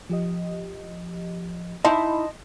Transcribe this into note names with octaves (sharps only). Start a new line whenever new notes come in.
F3 G4 D#5
D#4 E4 D#5 A5 C6